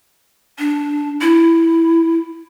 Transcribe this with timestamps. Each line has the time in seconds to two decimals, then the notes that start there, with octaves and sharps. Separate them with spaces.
0.59 D4
1.21 E4